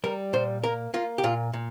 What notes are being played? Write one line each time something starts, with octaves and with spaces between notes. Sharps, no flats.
G3 A#4
A#2 C5
A#3 A#4
A#3 F4
G4
A#2 F4
A#2